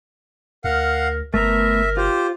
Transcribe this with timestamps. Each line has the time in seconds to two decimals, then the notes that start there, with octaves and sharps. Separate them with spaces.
0.64 D2 A#4 F5 F#5
1.34 G1 A3 B3 A#4 E5 A#5
1.97 F4 G4 C5